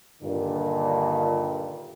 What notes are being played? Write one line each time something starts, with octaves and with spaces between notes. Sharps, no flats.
G2 A#2 D3 D#3